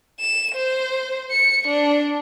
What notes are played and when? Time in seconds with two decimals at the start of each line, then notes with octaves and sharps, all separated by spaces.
0.20 E7
0.55 C5
1.31 C#7
1.67 D4